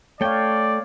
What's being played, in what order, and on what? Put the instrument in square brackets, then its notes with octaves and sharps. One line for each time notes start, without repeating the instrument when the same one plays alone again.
[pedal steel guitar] A3 G5 [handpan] C#5 F5 [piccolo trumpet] D5